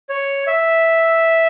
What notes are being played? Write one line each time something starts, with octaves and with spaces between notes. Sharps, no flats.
C#5
E5